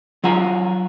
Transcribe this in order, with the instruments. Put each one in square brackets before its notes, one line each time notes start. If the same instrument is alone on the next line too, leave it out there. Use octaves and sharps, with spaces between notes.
[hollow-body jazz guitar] F#3 F4 F#5 G#5 A#5